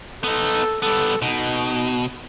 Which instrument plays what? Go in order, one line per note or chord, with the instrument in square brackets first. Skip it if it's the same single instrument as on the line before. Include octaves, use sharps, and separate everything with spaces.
[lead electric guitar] B3 D#4 [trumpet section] A4
[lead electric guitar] G3 B3 [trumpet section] A4
[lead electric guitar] B2 [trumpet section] D#4